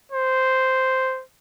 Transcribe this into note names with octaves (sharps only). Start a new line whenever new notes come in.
C5